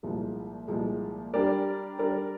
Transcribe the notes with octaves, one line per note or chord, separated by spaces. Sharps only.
C2 A#2 F3 G#3
C2 A#2 F3 G#3
G3 D4 G4 A#4 D5
G3 D4 G4 A#4 D5